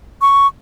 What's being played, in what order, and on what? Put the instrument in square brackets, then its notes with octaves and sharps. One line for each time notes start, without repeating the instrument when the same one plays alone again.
[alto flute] C#6